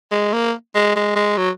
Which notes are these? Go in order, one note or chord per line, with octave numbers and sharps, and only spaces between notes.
G#3
A#3
G#3
G#3
G#3
F#3